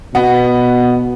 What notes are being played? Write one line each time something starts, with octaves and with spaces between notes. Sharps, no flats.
B2 B3